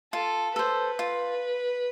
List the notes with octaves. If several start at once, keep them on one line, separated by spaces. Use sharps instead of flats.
F4 A4
A4 B4 C5
F4